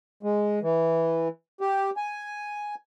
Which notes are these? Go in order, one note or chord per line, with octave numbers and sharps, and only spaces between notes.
G#3
E3
G4
G#5